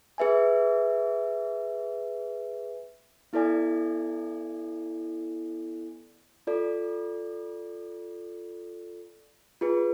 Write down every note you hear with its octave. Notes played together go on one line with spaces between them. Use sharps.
G#4 B4 E5 G#5
B3 E4 A4 D5 G#5
F4 A4 D5
F4 G#4 B4